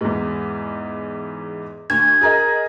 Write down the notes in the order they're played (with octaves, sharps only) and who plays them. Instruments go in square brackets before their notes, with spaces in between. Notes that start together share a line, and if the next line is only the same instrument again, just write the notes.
[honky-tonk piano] E2 G#2
[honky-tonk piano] D2 [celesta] G#6
[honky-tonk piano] G#4 A#4 D#5